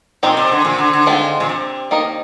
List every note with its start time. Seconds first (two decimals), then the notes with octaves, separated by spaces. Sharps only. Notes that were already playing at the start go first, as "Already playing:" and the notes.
0.23 A#2 C4 D#4 G4 A#4
0.37 C3
0.52 D3
0.65 A#2
0.78 D3
0.93 D3
1.06 D#3 G#3 C4 F4
1.40 A#2
1.49 C3
1.91 D#3 A#3 D#4 A#4 D#5